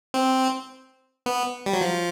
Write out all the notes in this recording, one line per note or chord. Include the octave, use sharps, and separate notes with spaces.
C4
B3
G3
F#3
F3